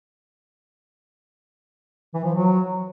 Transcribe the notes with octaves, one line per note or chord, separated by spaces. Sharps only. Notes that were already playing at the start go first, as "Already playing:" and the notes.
E3
F3
F#3